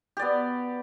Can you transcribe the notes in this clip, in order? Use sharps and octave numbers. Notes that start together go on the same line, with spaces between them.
B3 G4 D5